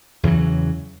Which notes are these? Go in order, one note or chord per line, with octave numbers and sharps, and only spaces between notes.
E2 C#3 E3 F#3